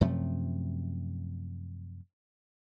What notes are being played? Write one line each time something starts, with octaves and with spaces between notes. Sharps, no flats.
F#2 C3 F3 A3